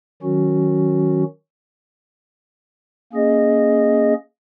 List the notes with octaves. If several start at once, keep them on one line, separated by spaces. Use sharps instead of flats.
D#3 F#3 C#4 F#4
A#3 C#4 G#4 D#5